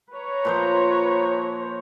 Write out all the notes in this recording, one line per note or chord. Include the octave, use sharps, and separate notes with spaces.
B4 C#5 A#5
A#2 F3 C5